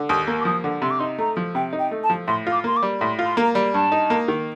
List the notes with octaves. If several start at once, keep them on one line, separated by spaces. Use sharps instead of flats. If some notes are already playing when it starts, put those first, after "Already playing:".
Already playing: D3
D#2 D#6
A#3
D6
F3 D#6
D3
C3 C6
D6
D#4 C6
A3 A#5
F3
C3 G5
D#4
G5
A3
A5
F3
A2 C6
F4
D6
A#3 C6
D6
G3
A2 C6
F4
C6
A#3 A#5
G3
G2 A5
D#4
A#3
D#3